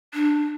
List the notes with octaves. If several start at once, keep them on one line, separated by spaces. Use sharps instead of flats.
D4